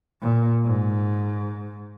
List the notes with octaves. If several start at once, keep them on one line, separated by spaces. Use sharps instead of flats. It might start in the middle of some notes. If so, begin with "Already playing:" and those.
A#2
G#2